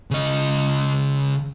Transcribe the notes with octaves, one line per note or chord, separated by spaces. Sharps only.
C#3 D#5